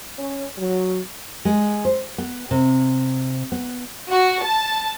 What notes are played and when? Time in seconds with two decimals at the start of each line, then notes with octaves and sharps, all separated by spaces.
0.19 C#4
0.58 F#3
1.45 G#3
1.85 C5
2.18 B3
2.51 C3
3.52 B3
4.10 F#4
4.42 A5